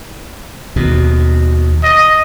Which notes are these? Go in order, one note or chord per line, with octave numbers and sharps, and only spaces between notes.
D#2 B2
D#5